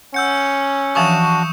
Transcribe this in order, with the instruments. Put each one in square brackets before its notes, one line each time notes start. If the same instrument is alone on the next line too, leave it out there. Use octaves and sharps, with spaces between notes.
[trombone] C#4 [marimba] F#5 [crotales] E6 G6 C#7
[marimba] E3 F3 G#5 [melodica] D4 F#4 [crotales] C#6 D#6 E7